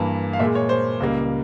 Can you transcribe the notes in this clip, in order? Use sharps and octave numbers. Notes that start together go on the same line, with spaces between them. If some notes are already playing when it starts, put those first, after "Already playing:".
Already playing: G2 E3 A#3
F5
A#2 G#3 E5
C#5
C5
C#2 C#3 G3 A#3